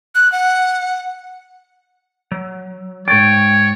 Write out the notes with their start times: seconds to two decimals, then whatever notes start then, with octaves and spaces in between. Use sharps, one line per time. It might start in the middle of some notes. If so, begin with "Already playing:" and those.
0.15 F#6
0.32 F#5
2.32 F#3
3.08 G#2 C#5 G5 C#6 A6